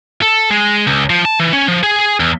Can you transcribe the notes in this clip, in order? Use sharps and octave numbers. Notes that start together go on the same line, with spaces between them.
A4
G#3
C#2
F3
A5
E3
C#4
F3
G#4
E2